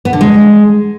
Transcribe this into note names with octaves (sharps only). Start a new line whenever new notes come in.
B3
D3
G#3